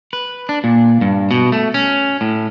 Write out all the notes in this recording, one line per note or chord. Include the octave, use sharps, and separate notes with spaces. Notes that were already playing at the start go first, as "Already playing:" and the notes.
B4
D4
A#2
G2
B2
A3
C#4
A2